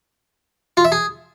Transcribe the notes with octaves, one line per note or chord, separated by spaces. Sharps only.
F4
E5
G#4